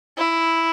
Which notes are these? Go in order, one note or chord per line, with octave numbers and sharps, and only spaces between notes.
E4